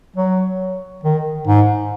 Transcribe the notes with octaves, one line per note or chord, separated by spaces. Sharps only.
F#3
D#3
G#2